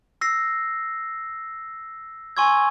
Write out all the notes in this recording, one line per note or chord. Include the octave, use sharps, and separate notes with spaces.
E6 A#6 C7
G#5 C6 C#6 E6 G#6